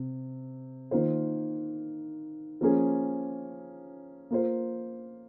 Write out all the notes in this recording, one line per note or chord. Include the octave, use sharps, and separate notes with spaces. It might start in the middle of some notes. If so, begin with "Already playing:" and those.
Already playing: C3
D#3 A#3 F4 C5
F3 A#3 C#4 G#4
A#3 F4 C5